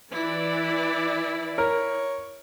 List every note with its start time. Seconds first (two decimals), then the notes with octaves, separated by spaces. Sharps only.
0.12 E3 E4 D5
1.58 A#4 C#5